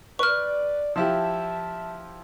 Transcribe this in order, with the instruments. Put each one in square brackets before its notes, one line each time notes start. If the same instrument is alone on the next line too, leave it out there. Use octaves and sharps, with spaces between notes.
[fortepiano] B4 [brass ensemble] D5 [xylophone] C#6 F6
[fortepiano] F3 E4 G4 [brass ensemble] E5 A5